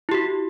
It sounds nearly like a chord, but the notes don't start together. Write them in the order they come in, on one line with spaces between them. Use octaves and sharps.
E4 G4 F#4